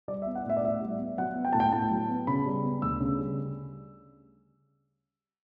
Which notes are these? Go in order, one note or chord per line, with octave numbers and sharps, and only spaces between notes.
G3 D5
E5
B3
F#5
A2 E5
D5
A2 E5
G3
B3
F#3 F#5
B3
G5
A2 A5
G5
A2 A5
F#3
B3
C#3 B5
G3
B3
D2 E6
C#3
G3